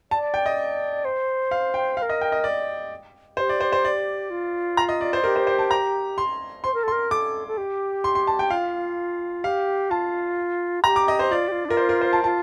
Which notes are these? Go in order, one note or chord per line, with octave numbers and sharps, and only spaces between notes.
D5 A5
G5
D#5
C5
F5
G5
C5 F5
A#4
D#5
G5
D#5
D5
G4 C5
D5
C5
C5
D5
F4
A#5
D#5
D5
C5
G4 A#4
C5
C5
A5
A#5
C6
C5 C6
A#4
A4
C6
A#4
A4 D6
A4
G4
C6
C6
A5
G5
F4 F5
G4 F5
F4 A5
G4 A#5
D6
D#5
C5
F4 D5
G4
F4
D4
F4 A#4
C5
A#4
C5
A5
F4 A5